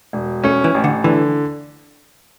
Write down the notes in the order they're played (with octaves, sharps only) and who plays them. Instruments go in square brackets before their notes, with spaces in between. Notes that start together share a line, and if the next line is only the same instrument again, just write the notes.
[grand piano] E1
[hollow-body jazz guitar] A3 [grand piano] C#4
[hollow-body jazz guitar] E3
[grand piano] A1
[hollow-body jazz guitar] D3
[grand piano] D3 [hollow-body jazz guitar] E3